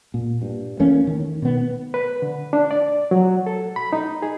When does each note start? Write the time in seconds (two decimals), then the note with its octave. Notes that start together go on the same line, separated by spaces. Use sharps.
0.14 A#2
0.42 G2
0.80 E2 A3 A#3 C#4
1.07 D#3
1.42 B2 B3
1.94 B4
2.22 D3
2.53 D4
2.71 D5
3.11 F#3
3.46 A4
3.76 B5
3.93 D#4
4.22 G#4